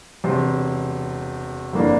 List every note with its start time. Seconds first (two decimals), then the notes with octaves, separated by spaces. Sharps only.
0.24 E1 E2 C3 C5
1.73 G1 F2 E3 A#3 D4